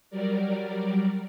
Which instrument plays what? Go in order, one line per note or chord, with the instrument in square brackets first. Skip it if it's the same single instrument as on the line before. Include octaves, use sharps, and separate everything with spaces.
[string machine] F#3 G3 A#4 D5